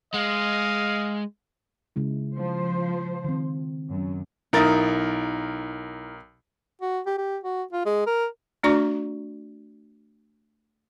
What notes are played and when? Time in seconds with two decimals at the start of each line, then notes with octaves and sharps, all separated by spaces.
0.14 G#3 D#5 F5
1.96 C#3 G#3 E4
2.36 F3 C5
3.24 D#3 C4
3.90 F#2
4.53 B1 D#4 E4 A#4 A6
6.82 F#4
7.06 G4
7.18 G4
7.44 F#4
7.73 F4
7.86 G#3
8.06 A#4
8.63 A3 D4 F#4 D5 A#5 C#6